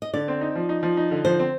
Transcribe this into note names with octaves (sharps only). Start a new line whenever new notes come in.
D#5
D3 D5
C4
D#4
F3
D#4
F3
D#4
D3
F3 C5
C4